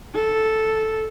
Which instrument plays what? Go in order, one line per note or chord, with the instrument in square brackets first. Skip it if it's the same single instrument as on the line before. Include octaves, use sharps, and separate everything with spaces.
[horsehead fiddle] A4